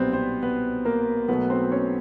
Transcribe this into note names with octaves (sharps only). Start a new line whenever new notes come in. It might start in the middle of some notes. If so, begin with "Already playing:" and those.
Already playing: B1 A#2 G3 B3 C4 B4 C5
C4 C5
B3 B4
A#3 A#4
B1 B2 F#3 A3 B3 B4
C4 C5
C#4 C#5